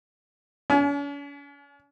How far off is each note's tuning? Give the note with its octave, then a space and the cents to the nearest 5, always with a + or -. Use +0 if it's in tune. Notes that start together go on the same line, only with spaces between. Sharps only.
C#4 +45 G#5 +30